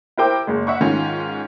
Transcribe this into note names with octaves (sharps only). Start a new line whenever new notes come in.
E4 G4 A#4 C5 G5 D6
F#1 G#3
E5 F#5 C#6
G#2 D#3 C#4 F4